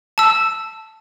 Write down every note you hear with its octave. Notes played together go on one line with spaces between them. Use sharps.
A5 E6